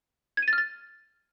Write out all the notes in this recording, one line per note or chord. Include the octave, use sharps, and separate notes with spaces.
G#6
D#7
A6
F6
A6